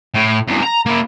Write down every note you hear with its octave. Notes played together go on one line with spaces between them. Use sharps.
A2
E2 G2
A#5
A#3 E4